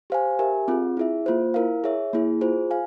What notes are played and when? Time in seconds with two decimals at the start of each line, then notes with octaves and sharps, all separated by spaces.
0.10 G4 C5 F5 G#5
0.39 G4 A#4 E5 G#5
0.68 C4 F4 G#4
0.97 E4 G#4 E5
1.26 A#3 F4 C5
1.54 E4 A#4 F5
1.84 G#4 C#5 E5
2.13 A#3 E4 G#4
2.41 F4 G#4 C5
2.71 F5 G#5